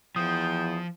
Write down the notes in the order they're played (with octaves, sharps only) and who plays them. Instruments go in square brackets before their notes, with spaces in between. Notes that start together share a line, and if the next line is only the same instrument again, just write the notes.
[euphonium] E2 [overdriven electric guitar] F3 [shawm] G5 [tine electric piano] D#6